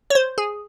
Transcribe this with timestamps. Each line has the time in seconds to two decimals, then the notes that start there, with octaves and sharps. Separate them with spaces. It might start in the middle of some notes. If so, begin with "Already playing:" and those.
0.10 C#5
0.15 C5
0.38 G#4